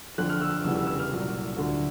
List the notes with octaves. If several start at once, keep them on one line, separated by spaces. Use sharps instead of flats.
F2 D3 F3 F#6
F6
E6
F1 E2 C#3 E3 G3 E6
E6
E6
F6
C2 A#2 F#3
D2 D3 F#3